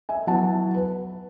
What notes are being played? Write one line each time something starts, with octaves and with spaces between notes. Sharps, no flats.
E5 G#5
F#3 B3 E4 F#5 A5
B4